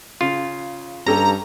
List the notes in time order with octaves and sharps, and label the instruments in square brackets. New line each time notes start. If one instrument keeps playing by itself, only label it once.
[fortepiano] C#3 [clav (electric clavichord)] F4
[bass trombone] G2 [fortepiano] C#4 G4 A4 [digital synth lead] A#5